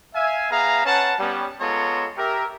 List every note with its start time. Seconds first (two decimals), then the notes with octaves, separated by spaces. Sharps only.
0.15 E5 F5 G#5
0.51 B3 G#4 E5 F5 A#5
0.85 C#4 B4 F#5 A5
1.19 G3 B3 C#4
1.61 G#3 B3 F4 A4 C#5 A#5
2.17 G4 A#4 E5